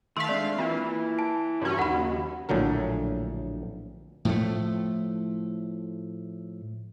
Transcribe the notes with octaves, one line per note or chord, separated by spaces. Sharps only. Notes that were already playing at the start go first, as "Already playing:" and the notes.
D#3 A3 F5 C6 B6
G#3 C4 D4 D5
E3 A#3 E4 F4
A5
G2 C#3 F3 C#4 F#4
D#2 F#5 B5
A#1 A2 D3 F#3 A#4
A2 F3 A3